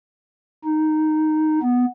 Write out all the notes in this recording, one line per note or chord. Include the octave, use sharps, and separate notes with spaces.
D#4
B3